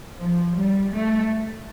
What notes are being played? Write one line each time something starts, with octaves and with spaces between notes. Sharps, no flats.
F3
G3
A3